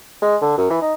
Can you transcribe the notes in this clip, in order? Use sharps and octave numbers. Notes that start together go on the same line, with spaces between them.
G#3
D3
F#2
E3
D#4